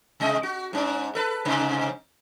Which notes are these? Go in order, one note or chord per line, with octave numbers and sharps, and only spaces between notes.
C3 G#3 D#5
F#4
G#2 C#4
A4 B4
G#2 C3